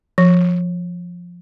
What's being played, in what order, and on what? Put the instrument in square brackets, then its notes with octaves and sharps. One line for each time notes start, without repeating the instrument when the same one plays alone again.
[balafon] F3